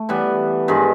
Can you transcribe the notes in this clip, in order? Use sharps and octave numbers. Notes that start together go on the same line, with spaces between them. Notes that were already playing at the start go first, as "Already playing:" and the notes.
Already playing: A3
E3 G3 B3
G2 D#3 G#3